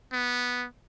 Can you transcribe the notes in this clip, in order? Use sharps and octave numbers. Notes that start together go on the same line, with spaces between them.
B3